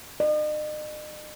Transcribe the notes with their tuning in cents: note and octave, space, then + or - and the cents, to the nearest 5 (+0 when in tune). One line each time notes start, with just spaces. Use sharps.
D#5 -45